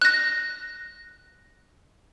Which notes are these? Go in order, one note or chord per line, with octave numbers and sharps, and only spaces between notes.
F#6 A#6